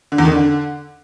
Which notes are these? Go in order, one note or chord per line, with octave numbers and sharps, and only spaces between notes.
D3
E2
D#3
D3